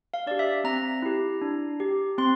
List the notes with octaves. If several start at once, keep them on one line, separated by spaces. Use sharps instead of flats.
F5
D4 G4 D5
E5
C4 A#5
E4 G4
D4
G4
C4 C6